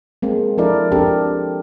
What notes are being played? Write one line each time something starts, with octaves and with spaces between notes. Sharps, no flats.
G#3 A#3 C4
F3 D4 E4 A4 A#4 D5
C4 D4 G4 A4 A#4